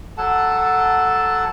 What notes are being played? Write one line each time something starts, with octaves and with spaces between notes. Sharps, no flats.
F#3 A4 F#5 A5